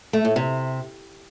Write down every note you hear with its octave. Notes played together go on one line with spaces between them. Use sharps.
A3
A2
C3